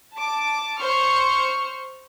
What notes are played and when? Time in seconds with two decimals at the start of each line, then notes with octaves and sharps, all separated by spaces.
0.15 A5 D6
0.80 C5 C#6 F6 C#7